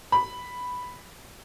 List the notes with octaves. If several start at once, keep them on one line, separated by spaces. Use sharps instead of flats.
B5